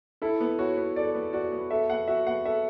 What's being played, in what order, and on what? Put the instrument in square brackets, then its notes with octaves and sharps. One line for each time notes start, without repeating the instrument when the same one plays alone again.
[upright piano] E4 [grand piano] A4
[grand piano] B3
[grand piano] F#4 [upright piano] C#5
[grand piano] B3
[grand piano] A4 [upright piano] D5
[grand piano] B3
[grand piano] F#4 [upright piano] D5
[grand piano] B3
[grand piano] A4 [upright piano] E5
[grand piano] B3 [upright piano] F#5
[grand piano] F#4 [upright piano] E5
[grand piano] B3 [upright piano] F#5
[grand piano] A4 [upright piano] E5